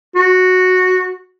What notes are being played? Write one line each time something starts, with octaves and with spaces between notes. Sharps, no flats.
F#4